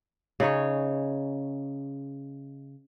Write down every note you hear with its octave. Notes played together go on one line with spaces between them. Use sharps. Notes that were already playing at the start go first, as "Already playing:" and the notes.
C#3 D#4 G#4 C#5